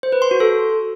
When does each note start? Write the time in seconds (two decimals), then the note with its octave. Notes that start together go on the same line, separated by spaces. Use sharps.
0.03 C5
0.12 B4
0.22 C6
0.31 F#4
0.40 A4